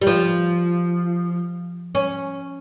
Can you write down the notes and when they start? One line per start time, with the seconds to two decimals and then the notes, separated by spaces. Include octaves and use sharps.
0.01 G3
0.07 F3
1.95 C#4